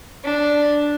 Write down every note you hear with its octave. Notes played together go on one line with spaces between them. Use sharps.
D4